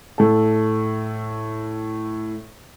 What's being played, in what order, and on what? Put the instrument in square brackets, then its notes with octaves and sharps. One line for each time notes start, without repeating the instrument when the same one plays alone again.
[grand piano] A2 A4